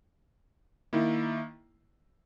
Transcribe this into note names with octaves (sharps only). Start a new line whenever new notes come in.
D#3 A#3 E4